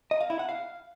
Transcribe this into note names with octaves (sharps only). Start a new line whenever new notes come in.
D#5
F5
E4
F#5
F5